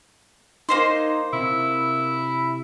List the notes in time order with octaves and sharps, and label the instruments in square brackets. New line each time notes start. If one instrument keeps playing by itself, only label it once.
[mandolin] A#3 C5 C6 [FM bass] D#4
[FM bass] C3 [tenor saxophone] E4